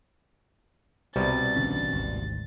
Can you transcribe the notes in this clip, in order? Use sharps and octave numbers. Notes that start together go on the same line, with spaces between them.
C2 B2 G3 A6
A1 D3 C#4
G#1 D2 G#2